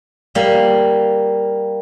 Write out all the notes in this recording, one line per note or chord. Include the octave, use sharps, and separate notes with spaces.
G3 A#3 F5